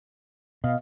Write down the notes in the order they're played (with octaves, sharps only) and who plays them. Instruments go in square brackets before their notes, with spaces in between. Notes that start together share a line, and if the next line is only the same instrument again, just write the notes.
[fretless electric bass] B2 [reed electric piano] D#5 F5